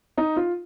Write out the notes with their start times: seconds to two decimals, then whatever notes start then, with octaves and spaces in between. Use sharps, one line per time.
0.17 D#4
0.36 F4